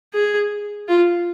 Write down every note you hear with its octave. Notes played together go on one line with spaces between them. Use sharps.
G#4
F4